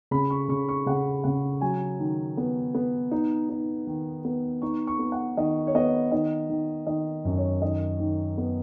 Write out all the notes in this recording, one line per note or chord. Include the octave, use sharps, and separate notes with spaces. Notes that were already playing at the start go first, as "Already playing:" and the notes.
C#3 B5
C#6
C#3 C#6
C#6
C#3 F#5
C#3 F#5
F#3 G#5
D#3
B3
B3
D#4
D#4
D#3
B3
D#4 C#6
C#6
B3
F#5
D#3 D#5
C#5
B3 D#5
D#3 D#5
D#3
D#3 D#5
F#2
C#5
D#3 D#5
D#3
B3